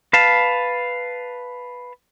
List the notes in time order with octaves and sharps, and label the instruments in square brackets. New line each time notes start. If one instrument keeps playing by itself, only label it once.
[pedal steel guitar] B4 F5 A5